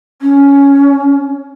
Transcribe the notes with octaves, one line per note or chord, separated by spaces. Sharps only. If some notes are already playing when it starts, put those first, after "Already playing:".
C#4